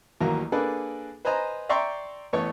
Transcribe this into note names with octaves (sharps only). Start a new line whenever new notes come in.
A1 D#2 F#3 A#3 A#5
A#3 D4 G#4 A4 B4
B4 C5 D#5 G#5 A#5
D5 E5 G5 A#5 C6 C#6
A1 A3 B3 C#5 C#6